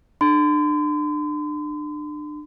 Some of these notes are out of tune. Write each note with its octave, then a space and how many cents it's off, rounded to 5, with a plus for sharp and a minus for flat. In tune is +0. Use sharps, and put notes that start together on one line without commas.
D4 +30 C6 -40